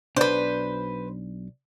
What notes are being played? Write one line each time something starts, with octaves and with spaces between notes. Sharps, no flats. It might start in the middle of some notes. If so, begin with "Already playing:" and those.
B1 D4 B4 C5 D5